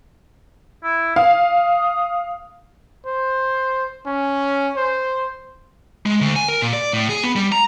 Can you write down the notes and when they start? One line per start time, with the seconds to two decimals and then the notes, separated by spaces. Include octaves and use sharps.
0.84 E4
1.16 F5 D#6
3.06 C5
4.07 C#4
4.77 C5
6.06 G#3
6.21 D2
6.36 G#5
6.49 A#4
6.62 A#2
6.73 D5
6.93 A2
7.09 G#4
7.23 B3
7.36 G3
7.52 A#5